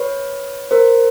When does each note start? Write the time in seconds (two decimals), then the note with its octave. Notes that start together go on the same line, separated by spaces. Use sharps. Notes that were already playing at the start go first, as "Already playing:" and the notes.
Already playing: B4 C#5
0.71 A#4 C5